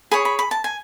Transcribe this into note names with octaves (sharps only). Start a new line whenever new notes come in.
G#4 C#5 B5
B5
B5
A5
G#5